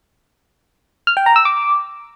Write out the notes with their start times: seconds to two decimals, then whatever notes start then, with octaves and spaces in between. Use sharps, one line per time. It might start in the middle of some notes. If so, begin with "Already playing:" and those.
1.07 F6
1.17 G5
1.26 A#5
1.36 E6
1.45 D6